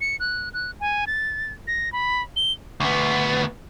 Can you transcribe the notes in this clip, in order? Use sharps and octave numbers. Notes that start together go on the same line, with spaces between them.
C#7
F#6
F#6
G#5
A6
A#6
B5
G7
D2 B3